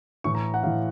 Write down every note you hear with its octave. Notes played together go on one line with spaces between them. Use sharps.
A2 E3 C#6
A#5
F#5
A2 E3 F5